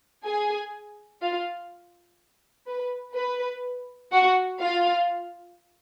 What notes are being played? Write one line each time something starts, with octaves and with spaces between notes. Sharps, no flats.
G#4 G#5
F4 F5
B4
B4
F#4 F#5
F4 F5